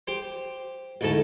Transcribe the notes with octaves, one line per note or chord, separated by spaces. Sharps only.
G4 C5
A1 D2 G#2 A3 A4 A5